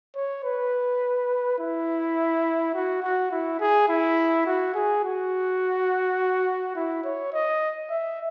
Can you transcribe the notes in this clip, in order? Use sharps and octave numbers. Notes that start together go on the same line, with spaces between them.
C#5
B4
E4
F#4
F#4
E4
G#4
E4
F#4
G#4
F#4
E4
C#5
D#5
E5